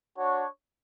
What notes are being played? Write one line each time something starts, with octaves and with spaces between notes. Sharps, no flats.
D4 F#4 C#5